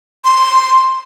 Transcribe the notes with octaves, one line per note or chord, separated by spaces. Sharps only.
C6